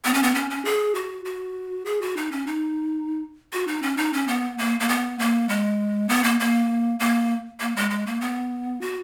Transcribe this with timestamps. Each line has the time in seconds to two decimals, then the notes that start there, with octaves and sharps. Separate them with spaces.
0.05 B3
0.14 C#4
0.23 B3
0.34 C#4
0.50 C#4
0.65 G#4
0.95 F#4
1.25 F#4
1.85 G#4
2.01 F#4
2.17 D#4
2.31 C#4
2.47 D#4
3.53 F#4
3.67 D#4
3.82 C#4
3.97 D#4
4.13 C#4
4.28 B3
4.58 A#3
4.80 A#3
4.89 B3
5.19 A#3
5.49 G#3
6.09 B3
6.24 A#3
6.40 A#3
6.99 A#3
7.60 A#3
7.76 G#3
7.90 G#3
8.06 A#3
8.21 B3
8.81 F#4